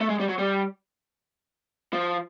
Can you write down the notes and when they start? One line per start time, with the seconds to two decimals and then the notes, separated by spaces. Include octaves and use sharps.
0.01 A3
0.10 G#3
0.20 G3
0.29 F#3
0.39 G3
1.93 F3